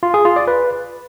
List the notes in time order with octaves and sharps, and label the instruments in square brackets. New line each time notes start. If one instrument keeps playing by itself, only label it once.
[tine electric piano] F4
G#4
F4
D5
B4